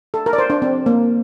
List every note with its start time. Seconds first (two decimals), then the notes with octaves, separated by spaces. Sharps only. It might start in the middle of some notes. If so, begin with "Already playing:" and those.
0.14 A4
0.26 A#4
0.33 D5
0.38 C5
0.50 D4
0.62 C4
0.86 A#3